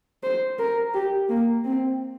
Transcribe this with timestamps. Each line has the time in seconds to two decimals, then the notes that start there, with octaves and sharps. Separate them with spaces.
0.23 C5
0.59 A#4
0.94 G4
1.29 A#3
1.65 C4